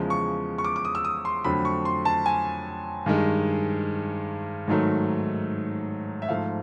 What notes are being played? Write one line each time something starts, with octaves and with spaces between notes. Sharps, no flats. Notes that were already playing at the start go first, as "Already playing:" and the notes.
Already playing: E2 C#3 F3 G#3
C#6
C#6
D6
D6
D#6
E6
D#6
C6
F2 D3 F#3 A3 B5
C#6
C6
A5
G#5
G2 D#3 G#3
G#2 D#3 F#3 A3
E5
G#2 F3 A3 F5